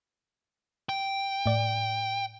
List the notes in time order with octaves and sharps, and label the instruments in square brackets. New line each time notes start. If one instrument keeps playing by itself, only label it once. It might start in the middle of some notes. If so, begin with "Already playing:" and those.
[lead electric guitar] G5
[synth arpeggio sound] A2 D5